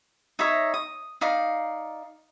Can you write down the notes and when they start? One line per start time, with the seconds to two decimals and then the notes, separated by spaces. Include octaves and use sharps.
0.39 D#4 C#5 D#5 E5
0.74 D#6
1.21 D#4 D5 F5